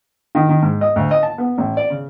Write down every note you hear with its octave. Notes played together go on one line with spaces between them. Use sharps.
D#3
D#3
G#2
D#5
D2
D#5
A5
B3
A1
D5
C#3